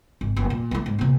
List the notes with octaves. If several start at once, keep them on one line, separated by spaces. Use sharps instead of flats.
G#1
F#1
A#2
E3 A3
G#2
A#1 C3